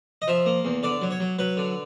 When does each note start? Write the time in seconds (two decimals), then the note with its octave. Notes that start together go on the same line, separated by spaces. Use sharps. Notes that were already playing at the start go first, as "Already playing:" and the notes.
0.22 D#5
0.28 F3 E5
0.46 A#3
0.65 E2
0.83 D3 D5
1.02 F#3
1.11 C#5
1.20 F#3
1.39 F#3 B4
1.57 D3